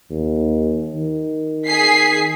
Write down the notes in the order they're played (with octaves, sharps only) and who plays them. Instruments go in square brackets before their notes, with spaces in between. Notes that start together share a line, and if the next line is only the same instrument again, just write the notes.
[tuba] D#2
D#3
[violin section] G#4 B6 C7